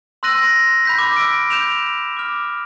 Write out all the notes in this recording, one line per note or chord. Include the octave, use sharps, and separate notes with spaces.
C6 E6 F#6 A#6 D#7 F#7
B5 G6 B6
D6 G6
E6 F6 D7
G6 E7 F7
D6 F6